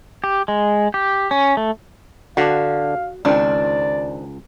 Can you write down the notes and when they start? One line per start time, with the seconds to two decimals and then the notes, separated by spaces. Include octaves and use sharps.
0.24 G4
0.48 G#3
0.94 G4
1.31 C#4
1.57 A3
2.37 D3 D4 F#4 F5
3.25 C#2 D#3 C4 D4 D5